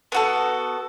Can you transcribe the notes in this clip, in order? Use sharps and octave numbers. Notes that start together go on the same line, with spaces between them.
B3 F#4 A4